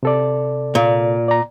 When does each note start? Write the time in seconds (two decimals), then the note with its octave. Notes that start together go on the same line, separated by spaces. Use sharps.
0.03 C3 A4 D5
0.75 A#2
1.28 D5 A#5